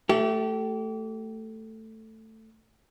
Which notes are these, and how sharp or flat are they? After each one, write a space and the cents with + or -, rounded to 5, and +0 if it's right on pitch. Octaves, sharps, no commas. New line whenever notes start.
A3 +5 G4 -30